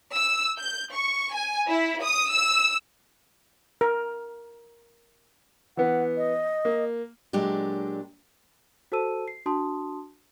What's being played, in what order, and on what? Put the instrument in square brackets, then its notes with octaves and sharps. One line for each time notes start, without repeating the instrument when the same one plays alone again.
[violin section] E6
G6
C#6
G#5
E4
D#6
E6
[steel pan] A#4
[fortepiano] E3 B3 [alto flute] F#5
[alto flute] D#5
[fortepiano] A#3
[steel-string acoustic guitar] A#2 F#3 G#3 D4 G4
[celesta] F#4 A4 C5 A5 E6 D#7
C7
D4 F#4 A5 C6 D#6